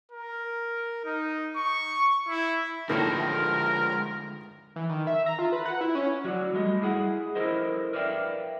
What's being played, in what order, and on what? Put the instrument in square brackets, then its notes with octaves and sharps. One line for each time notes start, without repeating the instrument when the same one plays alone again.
[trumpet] A#4
D#4
C#6
E4
[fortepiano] A2 D#3 A#3 [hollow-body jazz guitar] D3 A4 [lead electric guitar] F3 G#3 [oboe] A#4
[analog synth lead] E3
D#3
E5
A#5
F4
B4
F#5
E4
C#4
[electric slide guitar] F#3 F#4 D5
G3 A3 D#5
E4 G#4 F#5
E4 A4 A#4 C5 D#5
A#4 B4 D5 E5 F5 G5